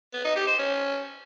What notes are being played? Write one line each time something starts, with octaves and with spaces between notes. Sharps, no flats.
B3
D#4
G4
C5
C#4